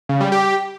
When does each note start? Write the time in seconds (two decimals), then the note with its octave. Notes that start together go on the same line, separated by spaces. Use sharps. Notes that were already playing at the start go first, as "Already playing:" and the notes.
0.09 C#3
0.20 G3
0.32 G4